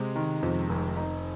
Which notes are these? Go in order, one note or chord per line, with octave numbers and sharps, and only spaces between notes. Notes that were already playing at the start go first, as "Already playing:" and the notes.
Already playing: C3 G#3
D#3
F2
F1
D#4